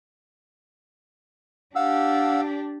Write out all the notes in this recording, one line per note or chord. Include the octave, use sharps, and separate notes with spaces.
D4 G4 F5 F#5 E6